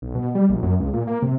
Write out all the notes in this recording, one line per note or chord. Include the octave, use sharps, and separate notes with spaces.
B1
B2
G3
A#1
F#2
C#2
A#2
A#3
C3